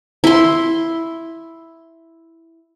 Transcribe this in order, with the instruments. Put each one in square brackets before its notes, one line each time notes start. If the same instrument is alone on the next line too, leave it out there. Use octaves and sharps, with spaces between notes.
[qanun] E4 C6